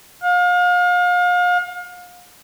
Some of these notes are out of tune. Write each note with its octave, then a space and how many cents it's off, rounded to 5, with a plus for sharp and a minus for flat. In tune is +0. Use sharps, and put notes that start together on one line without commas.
F5 +35